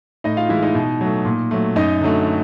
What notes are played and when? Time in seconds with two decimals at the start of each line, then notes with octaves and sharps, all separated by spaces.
0.24 A2 D#4 D#5
0.37 F4 F5
0.49 E3 G#3 E4 E5
0.62 D#4 D#5
0.75 B2
1.01 F#3 A3
1.25 A#2
1.51 F#3 A3
1.76 F#2 D#4 D#5
2.01 D3 F#3 A3